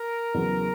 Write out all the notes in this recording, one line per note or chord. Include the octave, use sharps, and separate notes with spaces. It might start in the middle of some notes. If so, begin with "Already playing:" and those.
Already playing: A#4
E2 C#3 F#3 B3